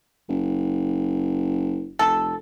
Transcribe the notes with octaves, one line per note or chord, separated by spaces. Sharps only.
F#1
F1 A4